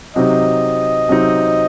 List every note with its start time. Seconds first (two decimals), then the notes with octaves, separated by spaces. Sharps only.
0.16 C3 F#3 C4 D#4 D#5
1.09 C3 F#3 C4 D#4